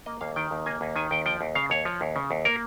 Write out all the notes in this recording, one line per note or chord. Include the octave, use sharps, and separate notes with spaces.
A#3 D#5
D#2 F5
D#3 G5
D#2
A#3 G#5
D#2
D#3 G#5
D#2 G5
F3 G5
D#2
C#3 F5
D#2 C#5
F3
D#2
C#3
D#2
A#3 A#4